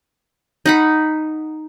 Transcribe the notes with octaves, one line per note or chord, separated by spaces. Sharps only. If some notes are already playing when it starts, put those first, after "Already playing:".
D#4 F#5 B5